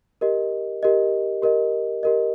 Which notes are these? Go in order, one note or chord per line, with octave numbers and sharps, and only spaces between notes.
G4 A#4 D#5
G4 A#4 D#5
G4 A#4 D#5
G4 A#4 D#5